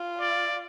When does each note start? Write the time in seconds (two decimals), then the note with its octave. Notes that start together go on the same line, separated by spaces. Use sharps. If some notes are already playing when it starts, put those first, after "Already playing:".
Already playing: F4
0.20 D5